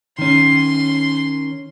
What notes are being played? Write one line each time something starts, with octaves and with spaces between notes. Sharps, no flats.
D#3 C#4 C6